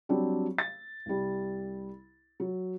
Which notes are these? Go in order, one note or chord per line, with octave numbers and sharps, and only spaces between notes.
F#3 G3 C4 D4
A6
C2 G3
F#3